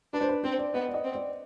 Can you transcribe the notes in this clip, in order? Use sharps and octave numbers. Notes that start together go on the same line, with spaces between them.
D4 B4
C5
B4
C4 C5
D5
B3 D#5
D5
D#5
C4
D5